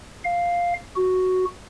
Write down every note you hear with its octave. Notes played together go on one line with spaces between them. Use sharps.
F5
F#4